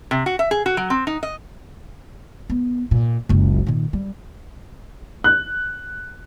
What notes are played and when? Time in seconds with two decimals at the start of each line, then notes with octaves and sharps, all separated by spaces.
0.11 C3
0.26 F#4
0.39 E5
0.51 G#4
0.66 F#4
0.77 F#3
0.90 C4
1.07 D#4
1.23 D#5
2.50 B3
2.91 A#2
3.29 F#1 C#2
3.67 A#2 D#3
3.93 G3
5.24 F#6